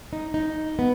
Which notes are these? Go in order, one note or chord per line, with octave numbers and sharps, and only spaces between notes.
D#4
D#4
B3